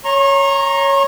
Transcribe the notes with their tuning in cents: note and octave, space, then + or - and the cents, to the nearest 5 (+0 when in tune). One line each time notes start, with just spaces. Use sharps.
C#5 +0 A#5 +0 C#6 -40